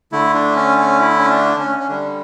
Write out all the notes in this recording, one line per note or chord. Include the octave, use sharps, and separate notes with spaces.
D3 A3 E4
D4
C#4
C#4
E4
C#4
D4
C#4
C#4
D3 G3 D4